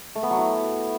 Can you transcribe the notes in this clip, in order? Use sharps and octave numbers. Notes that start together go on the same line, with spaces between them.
A3
B3
F#3
E4